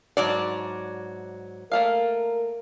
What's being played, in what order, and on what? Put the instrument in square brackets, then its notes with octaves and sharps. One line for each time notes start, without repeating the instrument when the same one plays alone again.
[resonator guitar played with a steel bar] G#2 F#3 D5 [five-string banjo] D4
[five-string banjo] A3 A#3 F5 [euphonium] A#4